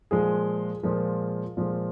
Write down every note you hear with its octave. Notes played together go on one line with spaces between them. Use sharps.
A#2 F3 G#3 G#4
A#2 F3 G#3 A#4
A#2 F3 G#3